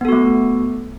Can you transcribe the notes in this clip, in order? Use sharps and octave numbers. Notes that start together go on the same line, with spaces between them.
A3 B3 F#4 A4